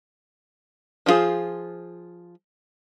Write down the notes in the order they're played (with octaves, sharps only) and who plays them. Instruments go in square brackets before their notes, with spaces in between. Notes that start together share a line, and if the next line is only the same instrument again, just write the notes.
[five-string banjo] F3 E4 F4 G#4 C5